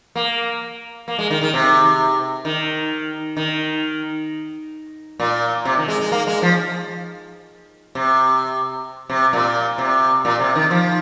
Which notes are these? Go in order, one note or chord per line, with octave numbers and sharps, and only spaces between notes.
A#3
A#3
G#3
D#3
D#3
C3
D#3
D#3
A#2
C3
D#3
G#3
G#3
A#3
G#3
F3
C3
C3
A#2
C3
A#2
C3
D#3
F3